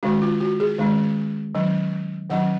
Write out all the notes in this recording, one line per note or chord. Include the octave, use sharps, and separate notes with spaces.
D#3 G#3 C#4 F#4
F4
F#4
G#4
D#3 G#3 C#4
D#3 F#3 C#4
D#3 F#3 C#4 F#5